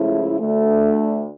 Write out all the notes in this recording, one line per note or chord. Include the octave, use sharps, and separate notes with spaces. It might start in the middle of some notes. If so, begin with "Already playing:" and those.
Already playing: C#2 C#3 F3 A3 E4
D2 D3 A3